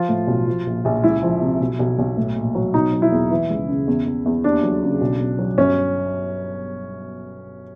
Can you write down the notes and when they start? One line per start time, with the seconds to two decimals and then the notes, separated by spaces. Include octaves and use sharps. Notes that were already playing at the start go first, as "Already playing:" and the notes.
Already playing: F3 F4
0.09 A2
0.27 B1
0.47 F3
0.66 A#1
0.85 A#1
1.04 C#2 E4
1.23 F3
1.42 C3
1.61 B1
1.79 B1
1.99 B1
2.17 A2
2.36 A#1
2.55 F#3
2.74 B2 D#4
2.93 F#3
3.02 E4
3.12 E2
3.31 E3
3.50 C#2
3.69 C#3
3.88 E2
4.07 E2
4.26 E2
4.44 D#2 D4
4.63 F#3
4.82 C#3
5.01 B1
5.20 B2
5.39 F#3
5.58 G1 C#4